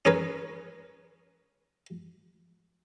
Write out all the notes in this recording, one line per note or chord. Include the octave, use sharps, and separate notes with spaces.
C#4 G#4 A#4 B4